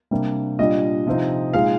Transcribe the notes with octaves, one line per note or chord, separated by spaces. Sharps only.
C3 G3 A#3 D4
A#2 G3 D4 D#5
C3 F3 C4 D#4
A#2 G#3 D#4 F5